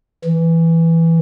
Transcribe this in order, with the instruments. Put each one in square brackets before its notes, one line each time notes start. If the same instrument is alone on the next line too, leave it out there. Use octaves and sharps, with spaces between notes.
[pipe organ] E3